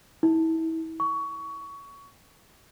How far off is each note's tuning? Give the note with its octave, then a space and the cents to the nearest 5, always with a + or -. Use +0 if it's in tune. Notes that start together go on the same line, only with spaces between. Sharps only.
E4 -30
C#6 +20